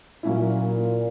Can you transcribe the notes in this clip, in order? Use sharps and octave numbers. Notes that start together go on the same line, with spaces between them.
A#2 F#3 A#3 C#4 E4